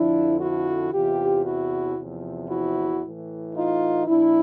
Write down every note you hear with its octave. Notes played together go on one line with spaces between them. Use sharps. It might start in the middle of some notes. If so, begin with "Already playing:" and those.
Already playing: F2 D3 F3 D4 E4
E4 F#4
E2 C3 E3 F4 G4
E4 F#4
E2 C3 F3
E4 F#4
A2 E3
D#4 F4
A#2 F3 D4 E4